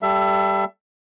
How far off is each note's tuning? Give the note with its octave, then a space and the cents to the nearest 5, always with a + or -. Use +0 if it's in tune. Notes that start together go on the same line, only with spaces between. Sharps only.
G3 +0 A4 +0 E5 +25